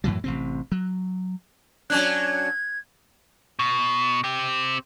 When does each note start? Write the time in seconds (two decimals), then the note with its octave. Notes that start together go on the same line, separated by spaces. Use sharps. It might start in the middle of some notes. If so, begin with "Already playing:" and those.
0.04 F#2 A2 E3 F#3
0.24 A1 C3 C4
0.72 F#3
1.90 F#3 C#4 D4 F#6 G#6 F#7
3.59 B2
4.24 C4 G4